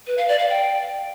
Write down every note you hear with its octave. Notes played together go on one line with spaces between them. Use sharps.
B4
F5
D5
F5
G5